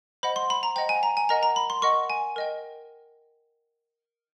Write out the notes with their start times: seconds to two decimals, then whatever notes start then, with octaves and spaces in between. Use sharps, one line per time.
0.23 C5 D#5 F#5 B5
0.36 C6
0.50 B5
0.63 A#5
0.76 C5 D#5 F#5 G5
0.89 G#5
1.03 A#5
1.17 G#5
1.29 A#4 D#5 F#5 A#5
1.43 A#5
1.56 B5
1.70 C6
1.82 A#4 D#5 F#5 C#6
2.10 G#5
2.36 A#4 D#5 G5